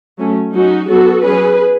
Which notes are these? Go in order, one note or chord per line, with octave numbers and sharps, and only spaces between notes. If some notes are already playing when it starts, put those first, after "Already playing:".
F#3 A3 C#4
F#3 C#4 D#4 F#4
F#3 B3 F#4 A4
F#3 C#4 G#4 B4